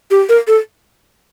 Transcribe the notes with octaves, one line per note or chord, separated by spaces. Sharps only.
G4
A#4
A4